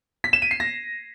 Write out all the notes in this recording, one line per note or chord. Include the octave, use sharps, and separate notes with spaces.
B6
E7
D#7
C7
A#6